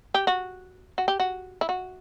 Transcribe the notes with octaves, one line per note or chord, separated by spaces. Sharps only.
G4
F#4
F#4
G4
F#4
E4
F#4